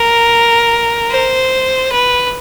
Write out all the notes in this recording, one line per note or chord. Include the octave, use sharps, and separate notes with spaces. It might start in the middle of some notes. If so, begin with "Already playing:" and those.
Already playing: A#4
C5
B4